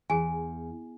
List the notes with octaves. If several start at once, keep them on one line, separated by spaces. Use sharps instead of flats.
E2 G#4 G#5